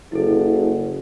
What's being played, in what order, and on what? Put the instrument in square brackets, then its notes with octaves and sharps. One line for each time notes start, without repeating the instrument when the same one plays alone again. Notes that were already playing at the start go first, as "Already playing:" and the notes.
[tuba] F#1 [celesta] E4 A4